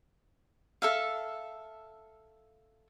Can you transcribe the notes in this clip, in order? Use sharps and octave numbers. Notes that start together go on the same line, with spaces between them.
A4 E5 F5